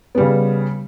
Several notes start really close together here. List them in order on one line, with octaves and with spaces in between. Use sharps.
B3 G3 C#3